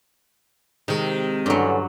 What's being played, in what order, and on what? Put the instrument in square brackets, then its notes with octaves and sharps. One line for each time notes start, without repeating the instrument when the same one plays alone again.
[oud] C3 G#3 [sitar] D#3
[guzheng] G2 F#3 [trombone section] D3 E3 C#4